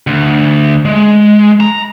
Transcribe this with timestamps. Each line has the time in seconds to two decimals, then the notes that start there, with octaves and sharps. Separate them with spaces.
0.07 D2
0.85 G#3
1.60 A#5